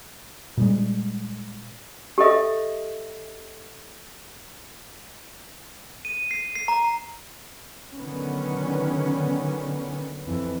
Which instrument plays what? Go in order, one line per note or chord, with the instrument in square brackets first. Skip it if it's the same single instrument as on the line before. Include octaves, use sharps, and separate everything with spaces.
[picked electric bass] A#2 G3 G#3
[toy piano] G4 A4 D#5 E5
[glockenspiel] D#7
C7
C7
A#5
[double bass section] D3 D#3 F#3 B3 C#4
F2 E3